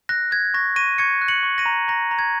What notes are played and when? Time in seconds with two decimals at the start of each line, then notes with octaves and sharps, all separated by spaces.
0.09 F#6 A#6
0.31 F#6 G#6
0.54 C#6 A#6
0.76 C#6 A#6 D#7
0.98 C#6 G#6 C#7
1.21 F#6
1.28 C#7 F#7
1.43 C#6
1.58 A#6 D#7
1.66 A#5
1.88 A#5 A#6
2.11 A#5
2.19 G#6